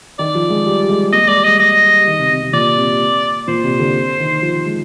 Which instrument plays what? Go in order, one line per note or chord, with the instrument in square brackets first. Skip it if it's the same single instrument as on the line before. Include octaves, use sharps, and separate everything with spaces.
[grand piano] D#3 [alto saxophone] D5
[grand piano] F3
G#3
G3
G#3
[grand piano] A#3 [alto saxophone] D#5
[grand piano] G#3
[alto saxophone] D5
[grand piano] G3
[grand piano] G#3 [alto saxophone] D#5
[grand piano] G#3 [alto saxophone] D#5
[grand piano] G3
D#3
C3
C3
C3
[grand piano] A#2 [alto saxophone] D5
[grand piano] C3
[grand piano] A#2 [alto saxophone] C5
[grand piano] C3
D3
D#3
F3
G#3